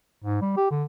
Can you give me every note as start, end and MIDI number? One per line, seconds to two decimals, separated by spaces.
0.24 0.40 44
0.41 0.56 55
0.57 0.66 67
0.71 0.84 50